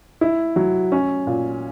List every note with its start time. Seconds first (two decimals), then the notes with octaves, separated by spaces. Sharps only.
0.21 E4
0.56 F#3
0.92 C#4
1.27 A#2